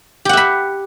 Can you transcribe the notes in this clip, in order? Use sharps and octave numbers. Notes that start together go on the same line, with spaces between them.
G4 E5 F#5 B5